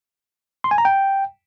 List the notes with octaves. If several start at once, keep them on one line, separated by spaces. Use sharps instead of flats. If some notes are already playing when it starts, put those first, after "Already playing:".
C6
G#5
A#5
G5